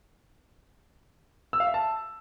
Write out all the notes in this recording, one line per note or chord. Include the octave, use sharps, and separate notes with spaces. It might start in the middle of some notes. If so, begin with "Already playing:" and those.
E6
F5
E5
A5